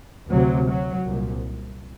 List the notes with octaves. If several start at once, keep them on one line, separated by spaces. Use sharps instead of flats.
D2 C3 F#3
F#3
C2 A#2